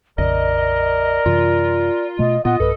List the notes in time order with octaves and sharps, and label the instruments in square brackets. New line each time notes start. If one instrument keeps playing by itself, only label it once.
[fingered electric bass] A#1 F2 C#3 [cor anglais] A#4 [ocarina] D5 [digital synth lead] D#5
[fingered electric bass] F#2 C3 E3 [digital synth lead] F4
[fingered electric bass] B2 A3 [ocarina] D#5
[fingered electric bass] A#2 B3 [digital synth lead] F4 [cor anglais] D#5 [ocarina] F#5
[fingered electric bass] B1 G2 [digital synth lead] A4 [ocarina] B4